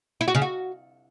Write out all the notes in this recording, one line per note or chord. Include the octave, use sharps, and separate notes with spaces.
E4
F#4
C#3
F#4